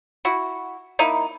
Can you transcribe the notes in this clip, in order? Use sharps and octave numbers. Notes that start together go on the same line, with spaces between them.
E4 F#4
A#3 D#4 E4